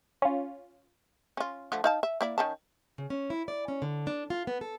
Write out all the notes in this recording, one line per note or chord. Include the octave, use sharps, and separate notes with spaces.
C#4 F4
C#4 F4
D3 F3 A3
D#4 F5 A5
E5
A#3 E4 D5
D#3 C#4 A5
C#3
C#4
E4
D5
C#4
D3
D4
F4
B3
A4